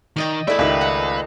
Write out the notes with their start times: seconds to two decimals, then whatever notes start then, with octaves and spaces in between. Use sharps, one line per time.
0.16 D#3 D5 D#5 G5
0.47 A3 E4 G#4 D5 E5
0.59 C#2 D#3 G4 B4
0.81 F#5